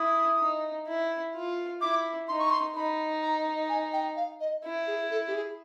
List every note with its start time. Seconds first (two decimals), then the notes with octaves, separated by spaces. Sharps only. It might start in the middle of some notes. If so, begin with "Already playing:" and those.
Already playing: E4 D#6
0.40 D#4
0.87 E4
1.35 F4
1.81 E4 D6
2.28 D#4 C6
2.39 C#6
2.50 C6
2.76 D#4 B5
3.22 A#5
3.69 G#5
3.93 G5
4.16 F5
4.40 D#5
4.64 E4
4.87 G#4
5.11 A4
5.27 G4
5.34 G#4